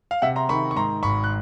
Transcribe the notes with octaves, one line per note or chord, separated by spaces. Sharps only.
F5
C3 E5 F#5
A#5 C6
D#3 B5 C#6
C#6
G#2 A#5 C6
G#1 B5 C#6
F#6